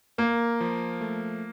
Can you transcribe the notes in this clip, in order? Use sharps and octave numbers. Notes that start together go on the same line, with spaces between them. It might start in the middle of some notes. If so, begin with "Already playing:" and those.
A#3 A#4
F3
A3